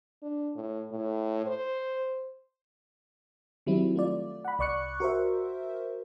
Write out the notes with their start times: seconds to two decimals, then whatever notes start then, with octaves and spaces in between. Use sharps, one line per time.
0.23 D4
0.56 A2
0.92 A2
1.46 C5
3.66 D#3 F#3 G3 C4 E4
3.96 A3 F4 D5
4.45 F#5 B5
4.59 C2 D5 C#6 F#6 C#7
5.00 F#4 A#4 C5 E5